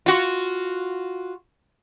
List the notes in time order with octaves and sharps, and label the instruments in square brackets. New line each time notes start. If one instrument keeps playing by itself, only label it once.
[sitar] F4 F#4